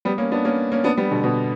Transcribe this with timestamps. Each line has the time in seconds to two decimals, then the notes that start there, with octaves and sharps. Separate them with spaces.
0.05 G3 B3
0.18 A#3 C#4
0.32 B3 D4
0.45 A#3 C#4
0.72 A#3 C#4
0.84 B3 D4
0.97 G3 B3
1.11 B2 D3
1.24 B2